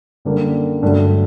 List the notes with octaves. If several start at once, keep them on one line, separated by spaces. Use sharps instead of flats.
F#2 D3 G3 A#3
G2 D3 F#3 A3